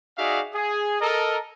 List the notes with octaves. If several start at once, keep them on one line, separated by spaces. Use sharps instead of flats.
D#4 F#4 G#4 D5 E5 F5
G#4
A4 A#4 D#5